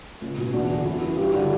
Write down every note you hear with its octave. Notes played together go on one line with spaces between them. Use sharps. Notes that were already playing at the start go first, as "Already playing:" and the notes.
C#2
B2
E2 D4 F#4
D3
F#2 E4
E3
G2 E4 G4
D3 D4 F#4